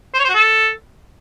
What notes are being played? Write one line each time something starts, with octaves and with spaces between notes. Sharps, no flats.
C5
C#5
C5
F#4
A4